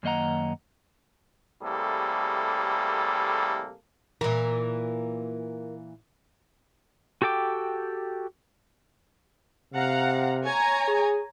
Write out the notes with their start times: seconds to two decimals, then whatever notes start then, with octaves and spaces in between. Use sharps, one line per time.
0.03 F#2 D#3 A#3 D#5 F#5 A#5
1.62 A2 C3 G3 A#3 G#4 A4
4.21 A#2 E3 A#4
7.22 F#4 G4 A4 G5 D6
9.73 C3 F5 F#5 A#5
10.45 C#5 G#5 A#5
10.88 G#4